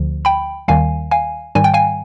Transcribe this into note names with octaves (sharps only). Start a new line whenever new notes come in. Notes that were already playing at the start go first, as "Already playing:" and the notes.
Already playing: D2 D3 F3
G5 B5
D#2 D#3 G3 F5 G#5
F5 G#5
G#2 D#3 G3 G#5
G5
F5 G#5